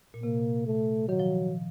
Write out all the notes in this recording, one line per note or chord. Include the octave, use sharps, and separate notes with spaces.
A#2
C3 A#3
A3
D#3 F#3
F3